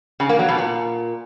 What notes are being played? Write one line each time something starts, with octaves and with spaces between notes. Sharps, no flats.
C#3
A#3
F#3
B2
A#2